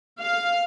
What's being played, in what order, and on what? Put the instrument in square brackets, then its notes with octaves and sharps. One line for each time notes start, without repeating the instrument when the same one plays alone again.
[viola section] F5